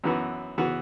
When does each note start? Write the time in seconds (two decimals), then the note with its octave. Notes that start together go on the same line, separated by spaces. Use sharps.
0.04 F#2 E3 B3 F#4
0.58 E3 B3 F#4